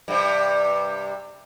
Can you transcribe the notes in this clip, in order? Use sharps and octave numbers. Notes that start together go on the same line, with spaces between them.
G2 C3